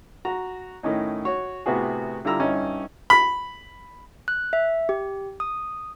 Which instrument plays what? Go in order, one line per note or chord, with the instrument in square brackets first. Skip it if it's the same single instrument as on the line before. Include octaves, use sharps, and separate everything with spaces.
[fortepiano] F#4 A#5
A2 D#3 C#4 D#4
F#4 C#5
A2 C3 B3 F#4 G#4
D3 G3 E4 F4 A#5 E6
G2 C#4 D#4 E4
B5
[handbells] F#6
E5
G4
D#6